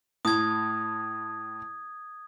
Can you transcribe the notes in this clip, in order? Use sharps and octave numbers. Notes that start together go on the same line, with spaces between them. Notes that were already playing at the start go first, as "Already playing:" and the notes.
A2 D#6 G#6